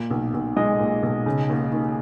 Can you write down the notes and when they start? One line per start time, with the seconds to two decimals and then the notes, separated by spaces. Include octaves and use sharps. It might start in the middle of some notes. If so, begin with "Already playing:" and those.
Already playing: A#2
0.11 B1
0.34 B1
0.57 G#3 D#5
0.79 A#2
1.03 B1
1.26 C#3
1.49 D#2
1.72 D#2